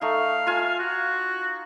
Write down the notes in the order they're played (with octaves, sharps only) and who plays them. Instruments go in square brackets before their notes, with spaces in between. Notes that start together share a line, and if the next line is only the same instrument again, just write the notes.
[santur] A3 D#4 [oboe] F5
[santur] F4 G#5
[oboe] F#4